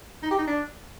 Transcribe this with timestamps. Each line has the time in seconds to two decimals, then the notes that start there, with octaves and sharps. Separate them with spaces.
0.23 D#4
0.31 G4
0.39 D#4
0.47 D4